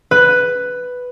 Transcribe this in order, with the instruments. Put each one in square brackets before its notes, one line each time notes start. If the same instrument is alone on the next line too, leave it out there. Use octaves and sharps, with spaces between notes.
[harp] B4